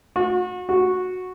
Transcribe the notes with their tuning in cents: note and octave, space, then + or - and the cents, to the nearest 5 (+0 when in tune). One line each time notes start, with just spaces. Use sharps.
F#4 -35
F#4 -10